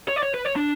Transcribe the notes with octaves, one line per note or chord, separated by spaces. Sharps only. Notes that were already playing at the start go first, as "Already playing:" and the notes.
C#5
D5
C#5
B4
C#5
D4